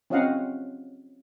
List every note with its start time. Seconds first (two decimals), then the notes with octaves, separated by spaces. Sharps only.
0.10 C4 C#4 F4 D#5 F5 F#5